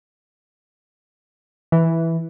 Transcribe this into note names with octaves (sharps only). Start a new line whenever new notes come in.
E3